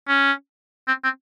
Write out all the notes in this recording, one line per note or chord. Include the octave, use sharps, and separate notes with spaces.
C#4
C4
C4